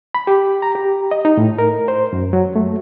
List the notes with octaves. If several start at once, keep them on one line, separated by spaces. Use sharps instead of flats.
B5
G4
A#5
G4
D#5
D#4
A2
A#4
C5
F#2
F#3
A3